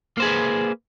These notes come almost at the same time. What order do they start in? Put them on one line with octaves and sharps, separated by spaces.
A#3 C5 G#4 B4